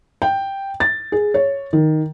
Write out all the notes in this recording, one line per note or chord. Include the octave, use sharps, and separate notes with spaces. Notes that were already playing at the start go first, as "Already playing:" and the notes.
G5
A6
G#4
C#5
D#3